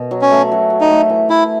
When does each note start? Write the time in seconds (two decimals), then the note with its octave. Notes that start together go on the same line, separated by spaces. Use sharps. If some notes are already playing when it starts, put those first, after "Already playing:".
Already playing: B2
0.11 F#3
0.22 C#4
0.31 A3
0.52 F#3
0.70 F#3
0.81 D#4
0.91 A3
1.09 E3
1.29 E3 E4